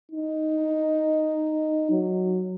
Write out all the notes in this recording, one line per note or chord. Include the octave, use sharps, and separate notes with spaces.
D#4
F#3